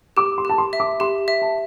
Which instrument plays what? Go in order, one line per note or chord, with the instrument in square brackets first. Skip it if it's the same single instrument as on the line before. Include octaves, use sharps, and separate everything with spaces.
[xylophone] G4 [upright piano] D6
[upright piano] C6
[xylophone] G4 [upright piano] A5
[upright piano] C6
[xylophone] E5
[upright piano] D6
[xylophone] G4 [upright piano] C6
[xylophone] E5
[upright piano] A5